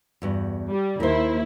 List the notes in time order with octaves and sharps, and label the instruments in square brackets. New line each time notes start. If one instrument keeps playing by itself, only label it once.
[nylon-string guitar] E2 G2 F#4
[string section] G3
[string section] D#2 E4 [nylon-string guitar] A#4 C5